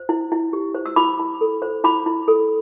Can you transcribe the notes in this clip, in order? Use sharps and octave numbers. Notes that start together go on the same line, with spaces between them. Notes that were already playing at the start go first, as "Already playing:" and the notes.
Already playing: C5
E4
E4
G4
C5
E6
E4 B5 D6
E4
A4
C5
E4 B5 D6
E4
A4